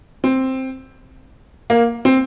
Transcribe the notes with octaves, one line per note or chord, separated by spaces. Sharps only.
C4
A#3
C4